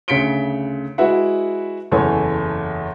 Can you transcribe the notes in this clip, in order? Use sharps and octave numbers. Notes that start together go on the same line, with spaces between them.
D2 C#3 B6 C#7 D7 G7
G#3 E4 F#4 B4 E5 F#5
F#1 E2 A4 C#5 G#5